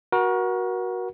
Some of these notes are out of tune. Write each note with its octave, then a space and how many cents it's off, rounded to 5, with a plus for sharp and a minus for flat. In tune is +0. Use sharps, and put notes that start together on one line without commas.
F#4 +0 A#4 +35